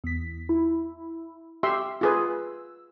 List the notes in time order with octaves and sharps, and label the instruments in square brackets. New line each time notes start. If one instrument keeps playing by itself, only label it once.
[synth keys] E2 B6
E4
[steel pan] G4 E5 C6 [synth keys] E6
[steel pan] F4 G#4 B4